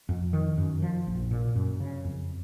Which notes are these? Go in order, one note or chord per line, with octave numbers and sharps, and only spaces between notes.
F2
D#3
F#2
F3
A#1
A#2
F#2
C#3
F2